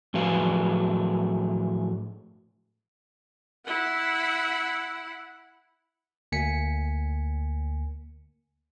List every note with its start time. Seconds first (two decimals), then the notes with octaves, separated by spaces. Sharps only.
0.14 A2 F3 F#3 G#4 B4 F5
3.66 E4 F#5
6.32 D2 A#3 G#5 B6 C#7